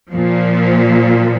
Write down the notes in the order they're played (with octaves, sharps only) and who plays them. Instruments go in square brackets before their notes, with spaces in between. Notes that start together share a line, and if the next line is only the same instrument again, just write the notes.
[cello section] A#2 F3